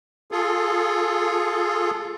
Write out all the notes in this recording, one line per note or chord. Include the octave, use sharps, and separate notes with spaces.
F4 G#4 A4